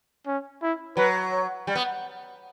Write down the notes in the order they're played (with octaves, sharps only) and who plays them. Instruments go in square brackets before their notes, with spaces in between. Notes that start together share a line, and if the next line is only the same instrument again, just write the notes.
[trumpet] C#4
E4
[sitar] F#3 [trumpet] B4
[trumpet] C#5
[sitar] G3
B3